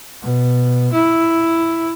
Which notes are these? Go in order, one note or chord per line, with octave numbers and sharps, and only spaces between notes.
B2
E4